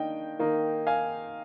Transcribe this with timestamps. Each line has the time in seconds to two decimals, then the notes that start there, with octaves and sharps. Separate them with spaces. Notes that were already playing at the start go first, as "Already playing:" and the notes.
Already playing: D#3 A#3 D4 D#5 G5
0.39 D#3 A#3 D#4
0.87 F5 G#5